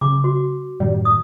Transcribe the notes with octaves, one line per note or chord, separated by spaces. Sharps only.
C#3 D6
F#4
F#2 A2 D#3 G3
D#6